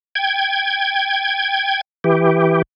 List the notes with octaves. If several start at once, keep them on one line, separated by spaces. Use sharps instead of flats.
G5 G#6
E3 G4